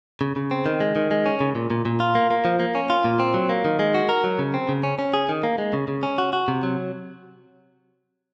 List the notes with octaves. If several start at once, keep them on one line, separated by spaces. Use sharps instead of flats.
C#3
C#3
C4
D#3
G#3
D#3
G#3
C#4
C#3
A#2
A#2
A#2
F4
A#3
A#3
F3
A#3
C#4
F4
A#2
C4
F#3
A#3
D#3
G#3
F#4
A#4
F#3
C#3
C4
C#3
C#4
C#4
G#4
D#3
A#3
G#3
C#3
C#3
C#4
F#4
F#4
C3
F#3